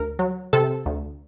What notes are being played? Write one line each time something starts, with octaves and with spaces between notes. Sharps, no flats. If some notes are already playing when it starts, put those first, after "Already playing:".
Already playing: D2 A#4
F#3
C3 A4
D2